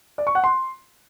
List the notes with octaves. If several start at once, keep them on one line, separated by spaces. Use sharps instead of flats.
D5
C#6
F#5
C6